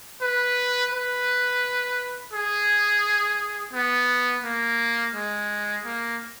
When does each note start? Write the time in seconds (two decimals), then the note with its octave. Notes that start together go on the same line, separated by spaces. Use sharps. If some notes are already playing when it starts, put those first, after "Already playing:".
0.21 B4
0.92 B4
2.33 G#4
3.73 B3
4.44 A#3
5.15 G#3
5.85 A#3